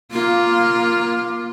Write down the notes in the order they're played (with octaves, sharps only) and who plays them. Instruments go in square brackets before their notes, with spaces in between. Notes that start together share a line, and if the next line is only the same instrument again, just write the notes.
[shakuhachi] A#3 [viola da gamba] F4